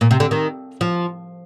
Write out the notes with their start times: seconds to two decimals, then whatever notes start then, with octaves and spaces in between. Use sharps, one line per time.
0.01 A#2
0.11 C3
0.20 D3
0.31 D#3
0.81 F3